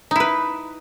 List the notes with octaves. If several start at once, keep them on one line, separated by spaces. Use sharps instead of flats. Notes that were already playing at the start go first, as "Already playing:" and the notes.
D#4 E4 B4